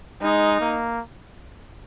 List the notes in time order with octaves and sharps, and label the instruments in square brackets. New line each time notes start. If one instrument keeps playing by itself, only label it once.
[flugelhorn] G#3 [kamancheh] D#4
[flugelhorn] A#3